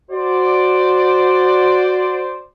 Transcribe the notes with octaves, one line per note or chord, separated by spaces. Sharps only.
F#4 C5 D5